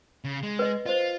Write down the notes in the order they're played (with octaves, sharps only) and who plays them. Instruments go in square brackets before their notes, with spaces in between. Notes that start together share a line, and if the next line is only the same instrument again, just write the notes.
[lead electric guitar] C#3
G#3
[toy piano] B4 D#5
[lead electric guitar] F4 [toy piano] C5 D#5